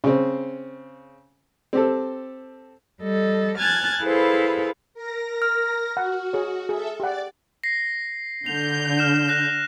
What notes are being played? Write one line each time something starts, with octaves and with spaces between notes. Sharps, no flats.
C#3 C4
C4 G4 A4
G3 A4 D#5
G#5 A5 F6 F#6 G#6 A6
E4 G#4 A4 B4 C5 F5
A#4 A#6
F6
F#4 F#5
G#4 C#5
G#4 A4 E5
G4 D5 F#5 A6
A#6 C7
D3 G6 F7
F6 E7
F#6 A#6 E7